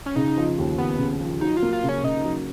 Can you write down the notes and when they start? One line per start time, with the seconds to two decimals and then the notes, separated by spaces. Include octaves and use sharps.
0.06 C#4
0.16 C#3 D#4
0.36 F3
0.58 D#2
0.78 D#2 B3
0.99 C#3
1.20 F3
1.41 F#3 D#4
1.57 F4
1.63 A#3
1.73 F4
1.83 C#3
1.89 C#4
2.03 C#3 D#4
2.24 F#3